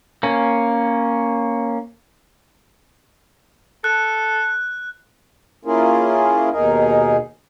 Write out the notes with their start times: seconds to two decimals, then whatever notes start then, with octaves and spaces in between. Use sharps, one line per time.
0.23 A#3 C#4
3.84 A4 F#6
5.65 A#3 C#4 E4 F4 G#4 A#4
6.51 D#2 B2 D#4 G#4 A#4